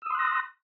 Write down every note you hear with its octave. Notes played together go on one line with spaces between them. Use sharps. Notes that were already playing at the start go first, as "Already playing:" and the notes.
C6 D#6 E6 F#6 A#6